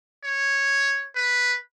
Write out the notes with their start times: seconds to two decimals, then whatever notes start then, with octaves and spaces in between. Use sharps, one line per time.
0.24 C#5
1.15 B4